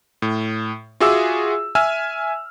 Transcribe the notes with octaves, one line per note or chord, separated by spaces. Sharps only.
A2
F4 F#4 G#4 E5 D6 E6
E5 G#5 E6 F6